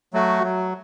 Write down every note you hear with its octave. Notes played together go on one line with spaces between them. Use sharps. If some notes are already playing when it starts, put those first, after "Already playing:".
F#3 A3 F#4
F#3